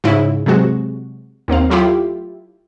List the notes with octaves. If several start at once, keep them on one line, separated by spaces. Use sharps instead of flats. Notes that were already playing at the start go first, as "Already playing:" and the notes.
G#2 C#3 E4
C3 F#3 G#3 F#4
D#2 A#3 C4 F5
F#3 A3 E4 F4 G4